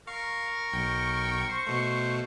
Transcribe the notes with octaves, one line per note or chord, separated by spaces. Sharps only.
A#4 F5 C#6
B1 G5
C5
B2 A3